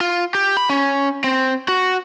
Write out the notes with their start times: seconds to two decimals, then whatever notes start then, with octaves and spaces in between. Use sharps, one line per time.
0.01 F4
0.35 G4
0.57 B5
0.70 C#4
1.24 C4
1.68 F#4